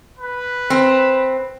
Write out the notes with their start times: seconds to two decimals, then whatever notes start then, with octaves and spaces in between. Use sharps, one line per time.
0.19 B4
0.70 C4